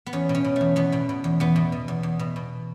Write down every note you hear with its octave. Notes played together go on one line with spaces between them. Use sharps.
B3
E2 C#4
B2
C#4
B2
A3
E2
E2 B3
B2
B2
E2
E2 B3
B2
B2
E2
E2
B2
B2